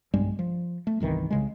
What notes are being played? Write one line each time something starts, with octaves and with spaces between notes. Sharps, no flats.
B1 G2 G3 G#3
F3
A3
G1 C2 D#3 E3
C2 C#3 G#3